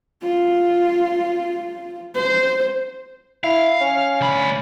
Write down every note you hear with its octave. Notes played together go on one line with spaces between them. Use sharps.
F4
C5
E4 F5
C#4
D2 B5